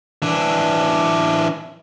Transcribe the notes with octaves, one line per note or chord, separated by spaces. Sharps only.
E3 D4